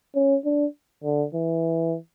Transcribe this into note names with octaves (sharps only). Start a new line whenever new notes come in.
C#4
D4
D3
E3